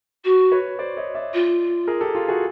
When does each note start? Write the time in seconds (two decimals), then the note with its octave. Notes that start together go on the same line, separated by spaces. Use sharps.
0.24 F#4
0.52 B4 C#5
0.79 C5 D5
0.97 C#5 D#5
1.15 D5 E5
1.33 F4
1.87 G#4 A#4
2.01 G4 A4
2.15 F4 G4
2.28 F#4 G#4